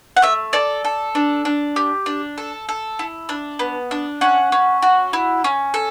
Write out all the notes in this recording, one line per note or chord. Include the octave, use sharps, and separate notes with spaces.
F#5
A3 E5
A4 D5
A4
D4
D4
G4
D4
A4
A4
E4
D4
B3
D4
C#4 F#5
C#4
F#4
E4
C#4
A4